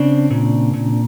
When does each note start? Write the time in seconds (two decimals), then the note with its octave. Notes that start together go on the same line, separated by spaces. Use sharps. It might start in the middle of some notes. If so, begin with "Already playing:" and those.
Already playing: C#3 C4 D4
0.30 A#2
0.73 A#2